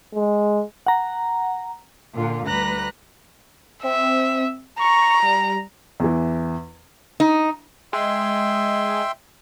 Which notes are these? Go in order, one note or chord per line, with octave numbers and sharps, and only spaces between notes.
G#3
F#5 A#5
A#2 D3 F4
D2 G3 B4 A#5 F#6 A#6
C4 E5
A#5 C#6
G3
E2 E3
D#4
G#3 E5 G5 C6